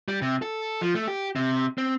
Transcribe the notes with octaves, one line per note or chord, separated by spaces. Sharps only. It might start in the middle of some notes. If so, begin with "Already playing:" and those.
G3
C3
A4
F3
A3
G4
C3
C4